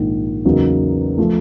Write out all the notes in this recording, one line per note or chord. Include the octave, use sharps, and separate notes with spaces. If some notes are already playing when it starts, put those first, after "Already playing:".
Already playing: A#1 G#2 D#3
E2 C#3 F#3 A#3 D#4
F3 A3